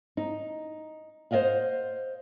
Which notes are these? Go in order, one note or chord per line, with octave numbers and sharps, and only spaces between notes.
D#4
C5 D5 D#5 F5 F#5